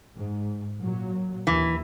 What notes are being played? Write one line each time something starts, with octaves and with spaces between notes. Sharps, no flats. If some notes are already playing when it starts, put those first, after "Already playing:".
G#2
A#2 F#3
D#2 E3